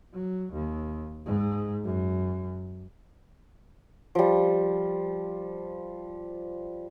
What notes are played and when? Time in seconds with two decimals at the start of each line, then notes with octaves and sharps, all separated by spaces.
0.13 F#3
0.52 D#2
1.25 G#2
1.84 F#2
4.15 F3 G3